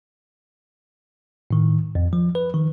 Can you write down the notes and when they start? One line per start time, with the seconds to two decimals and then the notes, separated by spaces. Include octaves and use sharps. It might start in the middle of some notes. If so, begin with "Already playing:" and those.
1.51 A2 D#3
1.95 F2
2.13 F3
2.35 B4
2.54 D#3